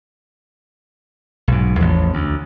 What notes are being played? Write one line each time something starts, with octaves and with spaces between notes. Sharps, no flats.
B1 G#2
A1 E2 F3
D2